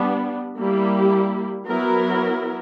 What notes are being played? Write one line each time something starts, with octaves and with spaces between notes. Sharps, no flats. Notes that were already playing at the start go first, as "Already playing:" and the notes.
Already playing: G3 B3 D4
G3 A#3 E4 G4
F#3 B3 E4 A#4